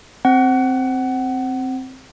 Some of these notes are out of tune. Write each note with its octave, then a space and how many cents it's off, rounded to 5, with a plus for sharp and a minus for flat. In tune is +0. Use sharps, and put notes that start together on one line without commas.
C4 +0 F#5 +25